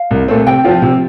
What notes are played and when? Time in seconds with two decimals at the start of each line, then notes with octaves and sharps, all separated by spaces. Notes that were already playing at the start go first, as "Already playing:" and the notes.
Already playing: F5
0.11 C2
0.28 A#2 A3 C4
0.46 C3 G5
0.64 F3 C4 F4
0.82 C3